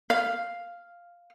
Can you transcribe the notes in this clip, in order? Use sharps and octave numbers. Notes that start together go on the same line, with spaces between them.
F5